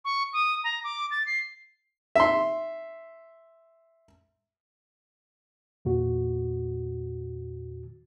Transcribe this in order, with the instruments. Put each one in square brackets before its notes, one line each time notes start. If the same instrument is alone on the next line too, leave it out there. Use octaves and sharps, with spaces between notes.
[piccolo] C#6
D#6
A#5
D6
A6
C7
[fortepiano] E5 C6
[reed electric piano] E2 A#2 F#4